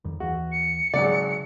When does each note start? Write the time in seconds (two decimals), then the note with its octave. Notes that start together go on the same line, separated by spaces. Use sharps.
0.05 F2 D#3 G3
0.20 D#2 E3 F#4
0.51 C#7
0.94 G#1 C#3 F#3 D5